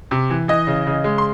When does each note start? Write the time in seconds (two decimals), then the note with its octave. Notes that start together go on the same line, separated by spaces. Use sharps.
0.11 C3
0.30 E3
0.48 E3 D#5 D#6
0.67 C#3
0.87 C#3
1.04 G#3
1.18 C6